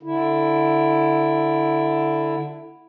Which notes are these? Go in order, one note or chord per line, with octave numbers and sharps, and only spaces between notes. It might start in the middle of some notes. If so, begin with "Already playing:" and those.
D3 E4